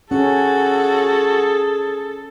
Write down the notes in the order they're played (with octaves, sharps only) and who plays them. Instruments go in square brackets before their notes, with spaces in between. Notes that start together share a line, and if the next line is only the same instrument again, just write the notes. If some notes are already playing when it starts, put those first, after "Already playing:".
[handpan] C#4 [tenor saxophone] F#4 [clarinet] G#4 [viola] A4